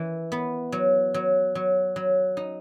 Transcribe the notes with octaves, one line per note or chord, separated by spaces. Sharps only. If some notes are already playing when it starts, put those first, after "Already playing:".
Already playing: E3
B3
F#3
F#3
F#3
F#3
D#4